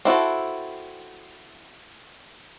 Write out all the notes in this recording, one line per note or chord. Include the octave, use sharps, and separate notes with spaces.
C4 E4 F#4 A4